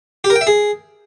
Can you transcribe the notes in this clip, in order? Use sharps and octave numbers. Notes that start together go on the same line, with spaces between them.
G4
A#4
G5
E5
G#4